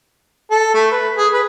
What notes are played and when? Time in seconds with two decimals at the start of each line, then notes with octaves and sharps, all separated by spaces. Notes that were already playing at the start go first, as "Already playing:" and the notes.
0.51 A4
0.74 A3
0.92 B4
1.18 G#4
1.33 B4